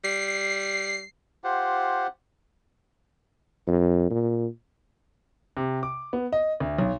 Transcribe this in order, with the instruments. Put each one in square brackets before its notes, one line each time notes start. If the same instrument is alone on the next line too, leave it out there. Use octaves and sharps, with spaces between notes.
[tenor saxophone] G3 [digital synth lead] C7
[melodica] F4 G4 C5 F#5
[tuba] F2
A#2
[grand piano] C3
D6
B3
D#5
D2
B1